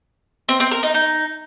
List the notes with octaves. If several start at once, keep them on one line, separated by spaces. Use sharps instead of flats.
C4
C4
A#4
D#4
D#4